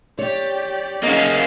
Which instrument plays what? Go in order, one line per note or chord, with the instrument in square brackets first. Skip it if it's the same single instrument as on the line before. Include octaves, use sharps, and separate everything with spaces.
[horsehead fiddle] G4 D5 [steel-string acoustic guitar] C#5
[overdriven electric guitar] A#3 C#4 [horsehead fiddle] G#4 F5 [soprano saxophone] D#5